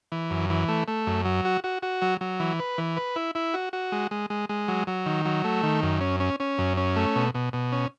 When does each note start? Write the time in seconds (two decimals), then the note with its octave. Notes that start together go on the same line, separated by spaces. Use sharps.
0.12 E3
0.30 F#2
0.50 E3
0.68 A3
0.88 A3
1.07 F#2
1.25 F#3
1.45 F#4
1.64 F#4
1.82 F#4
2.02 F#3
2.21 F#3
2.40 E3
2.59 B4
2.78 E3
2.97 B4
3.16 E4
3.35 E4
3.54 F#4
3.73 F#4
3.92 G#3
4.11 G#3
4.30 G#3
4.49 G#3
4.68 F#3
4.87 F#3
5.06 D#3
5.25 F#3
5.44 A3
5.63 D#3
5.82 F#2
6.01 C#4
6.20 C#4
6.40 C#4
6.58 F#2
6.77 C#4
6.96 A3
7.16 B2
7.34 B2
7.53 B2
7.72 C#4